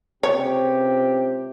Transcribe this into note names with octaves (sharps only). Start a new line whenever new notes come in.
C#2 C3 G4 C#5